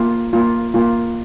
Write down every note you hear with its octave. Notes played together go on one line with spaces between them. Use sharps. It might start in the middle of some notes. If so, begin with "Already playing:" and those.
Already playing: A#3 F4
A#3 F4
A#3 F4